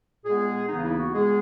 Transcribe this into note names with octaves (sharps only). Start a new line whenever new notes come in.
A#2 G#3 B3 G#4
D#2 C#3 E3 B3 D#4
E4
F#4
A#2 G#3 B3 G#4